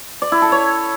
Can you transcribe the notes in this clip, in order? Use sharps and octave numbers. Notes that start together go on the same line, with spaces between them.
D5
E4
A4
C#5